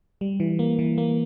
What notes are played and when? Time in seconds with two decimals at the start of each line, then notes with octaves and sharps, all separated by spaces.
0.21 G3
0.40 E3
0.59 A#3
0.79 E3
0.98 A#3